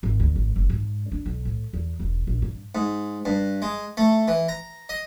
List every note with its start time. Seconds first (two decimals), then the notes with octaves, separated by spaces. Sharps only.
0.03 G#1
0.20 D2
0.36 G#1
0.56 F#1
0.70 G#2
1.12 D4
1.26 B1
1.45 A2
1.73 E2
1.99 E1
2.27 A#1
2.42 G2
2.75 G#2
3.25 G2
3.62 G#3
3.97 A3
4.28 E3
4.49 A#5
4.89 D#5